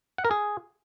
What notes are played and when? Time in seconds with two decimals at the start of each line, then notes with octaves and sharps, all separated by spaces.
0.18 F#5
0.25 A#4
0.31 G#4